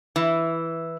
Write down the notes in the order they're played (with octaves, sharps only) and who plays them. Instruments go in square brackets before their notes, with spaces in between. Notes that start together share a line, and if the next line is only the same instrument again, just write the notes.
[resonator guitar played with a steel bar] E3